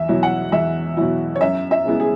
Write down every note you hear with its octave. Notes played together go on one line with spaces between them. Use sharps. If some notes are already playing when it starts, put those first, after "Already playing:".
Already playing: E2 E5
B2 F#3 E4
F#5
E2 E5
B2 F#3 E4
C#5
F#2 E5
E5
C#3 G#3 B3 E4
G#4